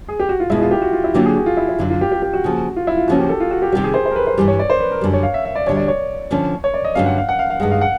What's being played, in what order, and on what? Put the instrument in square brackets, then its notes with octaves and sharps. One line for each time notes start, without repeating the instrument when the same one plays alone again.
[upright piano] G#4
G4
F#4
F4
[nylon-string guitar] E2 B2 G#3 [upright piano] E4
[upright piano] F4
G4
F#4
F4
E4
[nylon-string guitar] D3 F#3 A#3 D4 F4 [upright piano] G4
[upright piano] G#4
F#4
F4
E4
E4
[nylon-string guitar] F#2 D3 F#3 [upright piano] F4
[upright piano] F4
G4
G4
G4
F#4
[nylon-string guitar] C#3 F3 A#3
[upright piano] F4
E4
F4
[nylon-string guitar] D#2 C#3 F3 A#3 C#4 [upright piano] F#4
[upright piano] G4
A4
F4
F#4
G4
[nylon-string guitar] C3 D#3 G3 [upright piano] G4
[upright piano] G#4
C5
C5
A#4
B4
C5
[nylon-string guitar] G2 E3 G3
[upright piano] C#5
D5
C5
B4
A#4
[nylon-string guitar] F#2 D3 G3
[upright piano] C#5
F5
E5
E5
D5
[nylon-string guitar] D2 D3 G3 [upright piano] C#5
[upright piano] D5
C#5
[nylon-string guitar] D3 F3 A3 C#4
[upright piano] C#5
D5
D#5
[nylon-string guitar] G2 D3 F#3 A3 C#4 [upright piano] F5
[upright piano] F#5
F5
F#5
F5
F5
[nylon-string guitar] G2 D#3 G#3 [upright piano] F#5
[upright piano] F5
F#5